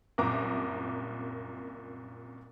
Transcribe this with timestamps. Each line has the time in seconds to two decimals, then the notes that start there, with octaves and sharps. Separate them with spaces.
0.18 F#1 C2 A#2 A#5 D6